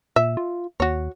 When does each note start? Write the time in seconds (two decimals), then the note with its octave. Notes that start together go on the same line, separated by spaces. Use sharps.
0.16 A#2 E5
0.37 F4
0.80 D#2 F#4 C#5